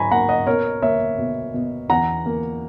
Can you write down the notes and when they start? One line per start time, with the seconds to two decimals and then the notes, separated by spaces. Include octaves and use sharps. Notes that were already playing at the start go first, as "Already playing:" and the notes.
Already playing: G#2 F#3 G#5 A#5 B5 C#6
0.11 A#3 F#5 A#5
0.29 D#5 F#5
0.47 B2 A#4 C#5
0.82 A#3 C#5 E5
1.19 B2
1.54 B2
1.90 E2 F#5 A#5
2.26 A#3